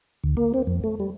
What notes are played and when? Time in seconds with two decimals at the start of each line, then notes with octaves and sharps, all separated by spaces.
0.24 D2
0.37 A#3
0.54 C4
0.67 F2
0.84 A3
1.00 G3